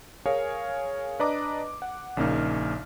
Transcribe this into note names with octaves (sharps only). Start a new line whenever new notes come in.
G#4 A#4 C#5 F5 G#5
D4 B4 D5 D#5 A#5 D6
F#5
A#1 C#3 A#3 D#4 F6